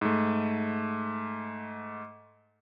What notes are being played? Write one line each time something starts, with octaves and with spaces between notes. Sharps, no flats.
G#2 A3